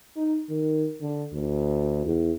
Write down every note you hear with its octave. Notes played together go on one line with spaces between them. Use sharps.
D#4
D#3
D3
D2
E2